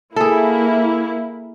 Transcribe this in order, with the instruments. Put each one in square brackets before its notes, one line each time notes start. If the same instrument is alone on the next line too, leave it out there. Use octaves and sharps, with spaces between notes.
[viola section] A#3 E4 [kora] G#4 A4